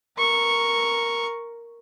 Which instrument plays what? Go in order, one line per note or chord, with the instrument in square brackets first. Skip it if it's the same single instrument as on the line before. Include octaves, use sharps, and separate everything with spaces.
[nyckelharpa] A#4 C#6